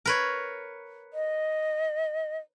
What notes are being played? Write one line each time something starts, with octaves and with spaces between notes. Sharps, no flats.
A#4 B4 C#5
D#5